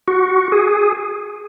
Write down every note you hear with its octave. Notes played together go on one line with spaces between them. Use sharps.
F#4
G#4